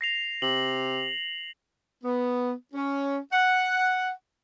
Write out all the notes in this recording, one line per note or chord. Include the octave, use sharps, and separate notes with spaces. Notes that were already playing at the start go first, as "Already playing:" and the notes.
A#6 C7 F7
C3 F#7
B3
C#4
F#5